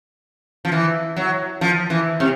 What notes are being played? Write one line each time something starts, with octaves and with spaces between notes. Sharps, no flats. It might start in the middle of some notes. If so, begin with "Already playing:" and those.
F3
E3
F#3
F3
E3
C3